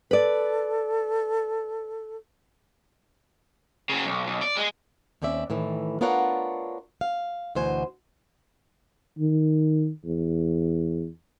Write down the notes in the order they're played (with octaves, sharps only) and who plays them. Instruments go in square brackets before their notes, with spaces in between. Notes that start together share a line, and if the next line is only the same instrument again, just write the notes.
[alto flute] A4 [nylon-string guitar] B4 D5
[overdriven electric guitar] C#3 F#3
B1
B1
D5
G#3
[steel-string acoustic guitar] D#2 C4 C#4 D5 E5
A2 D#3 E3
B3 D4 F4 A#4 C#5 F#5
F5
D2 B2 E3 C5 F#5 G#5
[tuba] D#3
E2